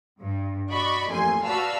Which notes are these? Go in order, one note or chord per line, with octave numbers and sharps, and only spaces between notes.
G2
F#4 D5 D#5 B5 C#6 D6
A1 F2 A#3 G#5 C6
F#4 B4 D5 F5 A5 E6